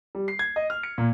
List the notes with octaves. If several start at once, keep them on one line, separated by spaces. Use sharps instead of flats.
G3
C7
G#6
D#5
F6
C#7
A#2